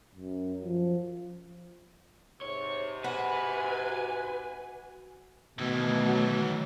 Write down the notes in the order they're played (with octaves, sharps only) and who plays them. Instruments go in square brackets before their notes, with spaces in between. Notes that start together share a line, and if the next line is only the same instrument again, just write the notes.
[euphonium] F#2
F3
[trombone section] G#2 C3 [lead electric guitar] C#5
[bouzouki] F#4 [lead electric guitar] B4 [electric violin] G#5
[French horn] B2 [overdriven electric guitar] D#3 E3 [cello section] A3
[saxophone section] F#3